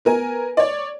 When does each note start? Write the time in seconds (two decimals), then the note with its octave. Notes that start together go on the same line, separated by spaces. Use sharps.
0.05 B3 A#4 G#5
0.57 C#5 D5